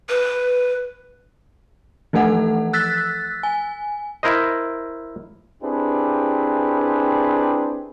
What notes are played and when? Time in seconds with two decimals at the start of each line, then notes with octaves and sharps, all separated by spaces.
0.09 B4
2.13 E3 F3 A3 A4 F#5
2.73 E6 F#6 A6 B6
3.43 G#5
4.23 E4 A#4 C5 D#5
5.62 C4 D4 E4 G4 G#4 B4